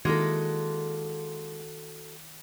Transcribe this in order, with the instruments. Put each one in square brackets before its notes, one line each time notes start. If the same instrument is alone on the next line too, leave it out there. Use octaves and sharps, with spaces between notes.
[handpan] D#3 E4 [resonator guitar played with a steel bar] G#3 A#3 [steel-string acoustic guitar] F#4 A4